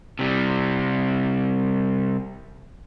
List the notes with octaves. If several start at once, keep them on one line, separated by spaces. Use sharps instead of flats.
C3 G3